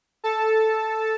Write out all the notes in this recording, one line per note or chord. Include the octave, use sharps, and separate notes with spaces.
A4 A5